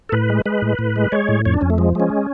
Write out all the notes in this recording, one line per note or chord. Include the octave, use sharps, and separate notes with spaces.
A4
A2 B4
G#3
G#3 B4
A2
A2
G#3
G#3 C#5
A2
F2 C#5
D4
F2 C#4
A3
F3 G#3
G#3 C#4